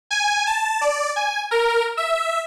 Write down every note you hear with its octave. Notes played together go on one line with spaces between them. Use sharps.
G#5
A5
D5
G#5
A#4
E5